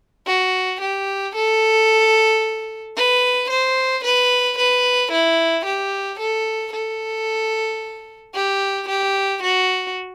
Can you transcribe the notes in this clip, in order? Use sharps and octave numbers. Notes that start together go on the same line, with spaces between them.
F#4
G4
A4
B4
C5
B4
B4
E4
G4
A4
A4
G4
G4
F#4